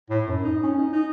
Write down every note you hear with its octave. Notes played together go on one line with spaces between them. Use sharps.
A2
F#2
D#4
C#4
D#4
D#4